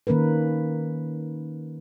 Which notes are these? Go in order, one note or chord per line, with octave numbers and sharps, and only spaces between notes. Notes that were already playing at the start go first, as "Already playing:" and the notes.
D#3 A#3 C#4 A#4 B4